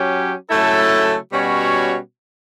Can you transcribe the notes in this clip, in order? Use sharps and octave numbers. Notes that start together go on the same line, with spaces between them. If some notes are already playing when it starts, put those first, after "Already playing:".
Already playing: F#3 C#4 G4
C#3 F#3 A3 E4 A4
B2 G3 C#4 F#4 C#5